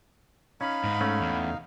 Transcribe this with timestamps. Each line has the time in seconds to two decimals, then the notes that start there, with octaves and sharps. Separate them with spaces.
0.61 C#4 D#4 F5 B5
0.84 G#2
1.01 A3 C#4
1.22 E2